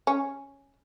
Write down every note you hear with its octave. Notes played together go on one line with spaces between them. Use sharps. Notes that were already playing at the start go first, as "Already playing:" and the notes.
C#4